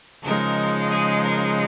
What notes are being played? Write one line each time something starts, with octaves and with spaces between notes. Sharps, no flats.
C#3 F3 G#3 D#4 A#4
G#4
A#4